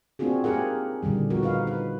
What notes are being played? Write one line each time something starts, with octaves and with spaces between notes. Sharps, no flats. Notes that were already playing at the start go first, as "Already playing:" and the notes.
A#3 C4 D4 F4 F#4 G#4
A#3 D#4 G4 G#4 A#4 F#5
A#2 D3 D#3 G3
F3 B3 F#4 A#4
D#4 B4 F5
B4